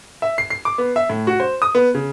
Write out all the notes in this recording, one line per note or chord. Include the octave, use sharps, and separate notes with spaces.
E5
C7
C7
D6
B3
E5
A2
F#4
C5
D#6
B3
C#3